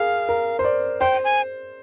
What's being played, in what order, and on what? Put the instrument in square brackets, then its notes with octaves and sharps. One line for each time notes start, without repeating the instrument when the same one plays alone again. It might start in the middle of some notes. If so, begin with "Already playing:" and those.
Already playing: [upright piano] G#4 A#4 [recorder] F5
[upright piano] A#4
C5
D5
[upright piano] C5 [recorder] G5
[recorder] G#5